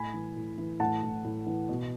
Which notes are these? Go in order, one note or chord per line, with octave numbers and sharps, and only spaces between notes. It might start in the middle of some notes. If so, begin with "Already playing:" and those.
Already playing: A2 G#5 B5
E3
A2
E3
A2 F#5 A5
A2
A2
E3
B2